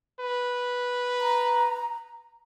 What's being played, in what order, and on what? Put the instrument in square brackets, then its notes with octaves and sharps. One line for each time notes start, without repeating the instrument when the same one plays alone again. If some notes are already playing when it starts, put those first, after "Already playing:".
[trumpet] B4
[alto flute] A#5